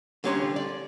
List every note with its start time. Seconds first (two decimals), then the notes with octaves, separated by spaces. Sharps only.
0.24 D3 G3 C#4 C#5 A5 C6
0.56 D5